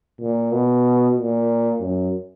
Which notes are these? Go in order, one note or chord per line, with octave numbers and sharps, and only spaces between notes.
A#2
B2
A#2
F#2